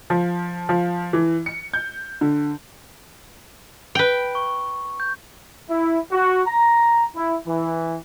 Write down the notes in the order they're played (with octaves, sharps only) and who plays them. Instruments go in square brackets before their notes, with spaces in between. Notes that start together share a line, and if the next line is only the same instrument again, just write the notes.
[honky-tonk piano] F3
F3
E3
C#7
G6
D3
[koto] B4 G5
[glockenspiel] C#6
G6
[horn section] E4
F#4
A#5
E4
E3